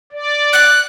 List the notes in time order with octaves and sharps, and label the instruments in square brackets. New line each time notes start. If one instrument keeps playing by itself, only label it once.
[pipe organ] D5
[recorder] F#6